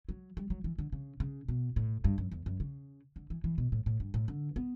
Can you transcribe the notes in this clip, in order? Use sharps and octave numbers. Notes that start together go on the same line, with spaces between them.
F#3
G3
F#3
E3
D3
C#3
C#3
B2
A2
G2
F#2
E2
F#2
C#3
D3
E3
E3
B2
A2
A2
G2
A2
D3
B3